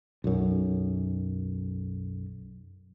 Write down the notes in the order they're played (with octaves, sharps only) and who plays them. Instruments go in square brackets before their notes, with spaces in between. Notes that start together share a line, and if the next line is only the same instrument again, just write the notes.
[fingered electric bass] B1 F#2